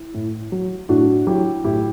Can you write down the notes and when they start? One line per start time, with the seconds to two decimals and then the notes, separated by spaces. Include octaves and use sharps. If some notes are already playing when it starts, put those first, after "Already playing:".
Already playing: E4
0.14 A2
0.52 F#3
0.89 A2 D4 F#4
1.27 F#3 E4 G4
1.64 A2 E4 G4